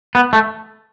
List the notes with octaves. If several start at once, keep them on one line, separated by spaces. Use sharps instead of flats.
B3
A3